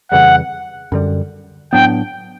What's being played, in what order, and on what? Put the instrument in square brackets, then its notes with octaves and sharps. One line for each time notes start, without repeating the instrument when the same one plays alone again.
[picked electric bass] F2 C#3 E3 G3 [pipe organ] F#5
[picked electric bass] F#2 D3 G3
[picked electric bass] A2 F#3 B3 D4 [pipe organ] G5